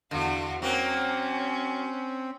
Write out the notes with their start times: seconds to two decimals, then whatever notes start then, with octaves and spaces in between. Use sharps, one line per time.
0.11 E2 D3 F#4 F5
0.62 F#3 A#3 C4 C#4